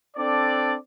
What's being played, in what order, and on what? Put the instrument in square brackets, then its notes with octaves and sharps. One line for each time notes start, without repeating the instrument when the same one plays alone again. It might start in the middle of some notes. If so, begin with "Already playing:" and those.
[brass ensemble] C4 D4 A4 D5